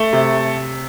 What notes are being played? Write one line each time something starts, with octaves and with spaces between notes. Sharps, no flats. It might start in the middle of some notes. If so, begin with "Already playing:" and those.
Already playing: A3
C3